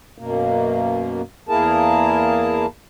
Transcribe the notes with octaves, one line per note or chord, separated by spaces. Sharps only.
F#2 B2 A#3
E2 A#3 E4 G#4 A#4 A5